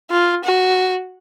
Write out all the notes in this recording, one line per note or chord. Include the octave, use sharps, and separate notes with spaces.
F4
F#4